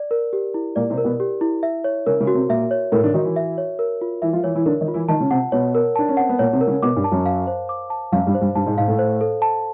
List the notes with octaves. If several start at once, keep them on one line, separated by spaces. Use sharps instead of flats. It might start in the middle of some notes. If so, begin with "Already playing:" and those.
Already playing: D5
A#4
G4
E4
A#2 A#3 D5
C3 C4
A#4
B2 B3
G4
E4
E5
C#5
C#3 C#4 A#4
C#3 C#4
F#4
C3 C4
A#2 A#3 E5
C#5
A2 A3 A#4
D3 D4
D#3 D#4 F#4
E3 E4
E5
C#5
A#4
F4
E3 E4 E5
F3 F4
E3 E4 C#5
E3 E4
D3 D4 A#4
D#3 D#4
F4
E3 E4
D#3 D#4 A5
C#3 C#4
C3 C4 F#5
B2 B3 C#5
A#4
D4 A5
C#4
C4 F#5
B3
A#2 A#3 C#5
C3 C4
A#4
C#3 C#4
B2 B3 D6
G2 G3
A5
F#2 F#3
F5
C5
D6
A5
F#2 F#3 F5
G2 G3
C5
G2 G3
G2 G3 A5
G#2 G#3
G#2 G#3 F5
A2 A3
C5
A4
A5